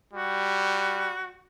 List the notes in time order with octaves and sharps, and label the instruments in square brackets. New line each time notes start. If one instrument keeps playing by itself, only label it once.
[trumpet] G3 [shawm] F#4